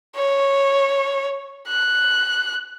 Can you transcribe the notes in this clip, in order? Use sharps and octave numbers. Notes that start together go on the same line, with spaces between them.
C#5
F#6